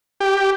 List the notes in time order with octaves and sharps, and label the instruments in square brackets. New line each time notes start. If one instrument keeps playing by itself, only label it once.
[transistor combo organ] G4